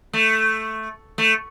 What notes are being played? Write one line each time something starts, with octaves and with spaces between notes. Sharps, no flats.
A3
A3